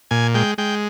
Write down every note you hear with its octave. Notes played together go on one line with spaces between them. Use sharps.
A#2 G#5
G#3 G5
G#3 G5